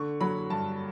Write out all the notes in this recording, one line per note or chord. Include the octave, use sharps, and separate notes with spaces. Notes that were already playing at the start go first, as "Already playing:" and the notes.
Already playing: D3 C#6
F#3 B5
G2 A5